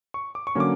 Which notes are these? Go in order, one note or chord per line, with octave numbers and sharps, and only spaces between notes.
C#6
D6
C#6
D3 F#3 A#3 C#4 D6